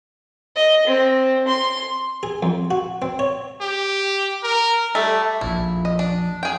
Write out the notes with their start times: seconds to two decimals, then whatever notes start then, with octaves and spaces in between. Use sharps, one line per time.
0.56 D#5
0.87 C4
1.48 C6
2.23 G#4
2.43 F2
2.71 F#4
3.02 C4
3.19 C#5
3.62 G4
4.43 A#4
4.95 G3 A3
5.41 A#1 F2 E4
5.85 D#5
5.99 D4
6.43 G#4 G5